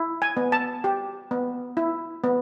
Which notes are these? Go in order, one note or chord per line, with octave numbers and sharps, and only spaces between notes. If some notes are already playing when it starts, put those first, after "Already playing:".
Already playing: E4
G#5
B3
A5
G4
B3
E4
B3